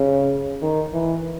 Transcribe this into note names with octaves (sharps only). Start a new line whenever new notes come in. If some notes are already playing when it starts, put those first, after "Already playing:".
Already playing: C#3
D#3
E3